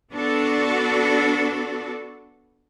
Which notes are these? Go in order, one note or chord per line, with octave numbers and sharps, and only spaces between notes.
B3 D4 F#4 A4